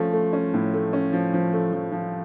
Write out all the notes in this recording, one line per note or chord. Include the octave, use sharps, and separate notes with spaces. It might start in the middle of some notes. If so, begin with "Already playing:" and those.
Already playing: F3 A3 C#4
A3
C#4
A2
A3
C#4
F3
F3
A3
F3
F3